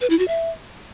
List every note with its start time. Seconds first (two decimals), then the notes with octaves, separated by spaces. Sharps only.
0.01 B4
0.10 E4
0.19 F#4
0.28 E5